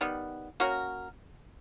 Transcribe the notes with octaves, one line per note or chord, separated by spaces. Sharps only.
D#3 G3 B3
A#3 C#4 F#4 A#4